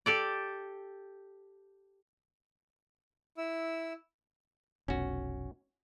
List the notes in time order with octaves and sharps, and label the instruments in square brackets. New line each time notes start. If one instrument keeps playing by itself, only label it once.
[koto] G4 A4 D5
[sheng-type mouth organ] E4 E6
[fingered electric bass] F1 B1 [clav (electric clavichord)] C#4 F#4